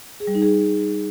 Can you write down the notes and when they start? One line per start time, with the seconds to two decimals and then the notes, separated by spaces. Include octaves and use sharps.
0.20 G#4
0.27 G3
0.35 D#4
0.42 G#4